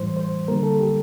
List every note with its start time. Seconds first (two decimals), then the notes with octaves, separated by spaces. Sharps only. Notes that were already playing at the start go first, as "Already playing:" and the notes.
Already playing: A2 E3 G3 C5
0.17 C5
0.48 D3 G3 A#3 A#4
0.63 A4
0.80 G4